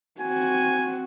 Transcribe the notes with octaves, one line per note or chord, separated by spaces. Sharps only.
C4 F#4 G#5